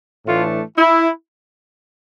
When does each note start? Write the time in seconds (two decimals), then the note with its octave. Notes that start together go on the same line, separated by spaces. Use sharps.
0.26 A2 E3 A3 D4 F4
0.78 E4